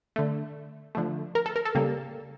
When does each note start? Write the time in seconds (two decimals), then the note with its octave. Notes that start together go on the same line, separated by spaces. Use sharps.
0.16 D3 A3
0.95 D3 F3 A3
1.35 A#4
1.46 A4
1.56 A#4
1.65 A4
1.75 C#3 G3 A#3